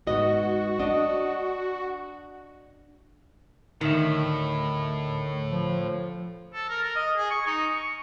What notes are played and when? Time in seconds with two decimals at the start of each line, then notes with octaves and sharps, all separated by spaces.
0.07 G#2 B3 F#4 D#5
0.80 D4 D#5
3.81 D2 A2 D3 D#3 E5
5.51 F3
6.54 A4
6.69 A#4
6.82 A#4
6.96 D#5
7.17 G#4
7.31 C#6
7.46 D#4
7.75 C#6